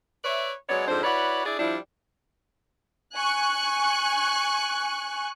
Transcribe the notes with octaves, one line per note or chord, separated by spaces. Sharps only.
B4 C#5 D5 E5
F#3 G#3 B3 C#5 D5
F2 G#2 C4 D4 C5
E4 F#4 B4 C#5 D5
D4 E4 G#4 D5
F3 G3 D4 E4
G#5 C#6 F#6